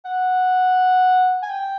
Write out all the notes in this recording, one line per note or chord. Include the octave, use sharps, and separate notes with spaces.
F#5
G#5
G5